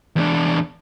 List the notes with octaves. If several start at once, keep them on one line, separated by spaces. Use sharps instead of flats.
E2 D4